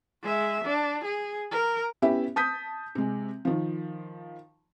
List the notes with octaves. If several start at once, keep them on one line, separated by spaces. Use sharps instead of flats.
G#3 E5
D4
G#4
A#4
B3 C#4 E4 G4 E5
A5 D#6 G6 B6
C3 G#3
D#3 F3